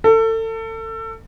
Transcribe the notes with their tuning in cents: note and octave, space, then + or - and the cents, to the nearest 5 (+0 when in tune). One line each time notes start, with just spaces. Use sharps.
A4 +30